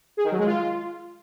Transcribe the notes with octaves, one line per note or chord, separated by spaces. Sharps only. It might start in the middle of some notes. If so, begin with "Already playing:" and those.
G#4
D#3
F#3
G#3
F4